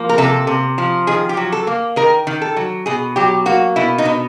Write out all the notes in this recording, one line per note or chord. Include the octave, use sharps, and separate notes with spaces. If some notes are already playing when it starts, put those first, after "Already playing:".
Already playing: F3 A#3
A#4
C3 A4
C3
F3
D#3 G#4
G4
F#3
A4
A#3
D#3 A#4
D#3
A4
F#3
B2 G#4
F#3 G4
A#3 F#4
B2 E4
D#4
B2